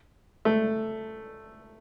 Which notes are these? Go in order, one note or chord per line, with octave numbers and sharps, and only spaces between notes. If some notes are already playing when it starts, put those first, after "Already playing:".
A3